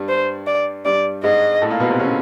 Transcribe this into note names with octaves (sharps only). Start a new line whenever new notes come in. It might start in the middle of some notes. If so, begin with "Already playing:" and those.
Already playing: G2 G3
C5
D5
G2 G3 D5
G#2 G#3 D#5
A2 A3
A#2 A#3
B2 B3
C3 C4
C#3 C#4